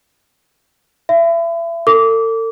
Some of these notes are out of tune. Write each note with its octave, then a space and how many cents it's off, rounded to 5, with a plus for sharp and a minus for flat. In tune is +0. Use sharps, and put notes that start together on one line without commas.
E5 +35 B5 +40
A4 +40 D6 -20